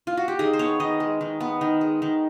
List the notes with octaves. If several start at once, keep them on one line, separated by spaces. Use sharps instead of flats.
F4
F#4
G4
D#3 G#4
C5
B3 C#5
D#3 D#5
G#3
D#3
B3
D#3
G#3
D#3